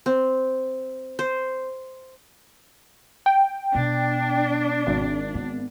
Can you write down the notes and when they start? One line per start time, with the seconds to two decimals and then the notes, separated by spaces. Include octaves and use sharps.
0.06 C4
1.19 C5
3.26 G5
3.75 B2 D4
4.87 G#1
5.34 B3